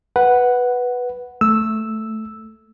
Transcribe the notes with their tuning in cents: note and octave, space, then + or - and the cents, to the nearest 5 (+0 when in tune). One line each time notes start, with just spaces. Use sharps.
B4 +0 F#5 +0
A3 +0 E6 -5